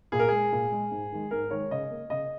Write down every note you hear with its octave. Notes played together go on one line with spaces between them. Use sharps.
A#2 G#4
A#4
G#3 G#4
A#2
G#3
G#2
D#3 G#3
G#2 A#4
D#3 G#3 C#5
C#3 D#5
A#3
C#3 D#5